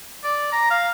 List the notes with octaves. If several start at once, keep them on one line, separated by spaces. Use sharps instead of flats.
D5
A#5
F5